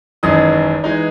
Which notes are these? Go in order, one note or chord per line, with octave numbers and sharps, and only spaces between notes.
G#1 F#2 E3 G#3 D#4 D#6
E3 G#3 D#4